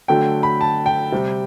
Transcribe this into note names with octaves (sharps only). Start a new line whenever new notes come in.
D3 F#3 A3 G5
B5
A5
G5
C3 G3